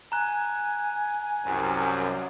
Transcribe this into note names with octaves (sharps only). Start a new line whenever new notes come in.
G#5 A#5 F#6
C2 F#2